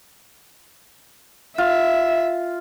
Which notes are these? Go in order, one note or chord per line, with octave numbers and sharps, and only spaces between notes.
F4 E5